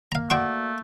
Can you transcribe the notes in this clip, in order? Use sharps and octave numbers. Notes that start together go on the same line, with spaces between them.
A#3 F5 A#5
A3 F#4 D5 F#5 G5 C6 C#6